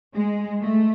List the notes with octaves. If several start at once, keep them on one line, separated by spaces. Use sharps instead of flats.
G#3
A3